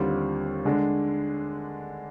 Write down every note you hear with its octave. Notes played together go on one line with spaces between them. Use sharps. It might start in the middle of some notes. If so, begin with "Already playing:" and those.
Already playing: D#2 D3 G3 C4 F4
D3 G#3 D4